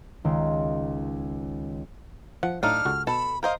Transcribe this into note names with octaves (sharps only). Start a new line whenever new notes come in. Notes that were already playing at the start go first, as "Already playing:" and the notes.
C#2 D#3 C6
F3 F#5
A2 F#3 D4 D#4 F5 F6
C#2 F#4 A4
B2 A4 A5 B5
A#4 C5 D#5 F5